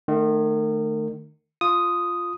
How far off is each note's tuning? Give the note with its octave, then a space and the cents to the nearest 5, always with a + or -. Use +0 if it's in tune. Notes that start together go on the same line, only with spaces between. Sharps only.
D#3 -35 A3 +0
F4 +0 D#6 +0